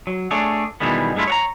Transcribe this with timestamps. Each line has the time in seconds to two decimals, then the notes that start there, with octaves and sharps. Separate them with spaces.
0.07 F#3
0.31 A3 D4 G#4 C#5
0.80 B2 D#3 E3 G3 G#3 B3
1.16 G2 G#3 A3 E4 F4
1.27 C#5 F#5 A#5